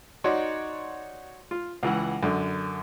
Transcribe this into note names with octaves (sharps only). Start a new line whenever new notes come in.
D#4 F#4 C#5 D5 F#5 C6
F4
C#2 E3 F#5
F#2 D3